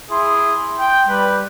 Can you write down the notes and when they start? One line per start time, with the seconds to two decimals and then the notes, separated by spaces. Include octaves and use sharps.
0.11 E4 G#4 C6
0.78 G5
1.09 G3 B4